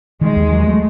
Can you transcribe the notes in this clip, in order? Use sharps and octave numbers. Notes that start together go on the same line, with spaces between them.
D#3 G#3
D#2
F#3
A3